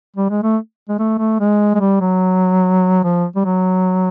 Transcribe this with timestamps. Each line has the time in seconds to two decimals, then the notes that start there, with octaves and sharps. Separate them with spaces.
0.16 G3
0.30 G#3
0.43 A3
0.89 G#3
0.99 A3
1.18 A3
1.40 G#3
1.75 G#3
1.80 G3
2.01 F#3
3.04 F3
3.36 G3
3.45 F#3